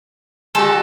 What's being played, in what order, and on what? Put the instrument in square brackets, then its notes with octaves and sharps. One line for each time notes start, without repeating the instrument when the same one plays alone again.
[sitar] G3 F#4 [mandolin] A4